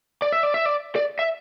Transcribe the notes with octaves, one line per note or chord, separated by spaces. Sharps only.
D5
E5
D5
E5
D5
D5
E5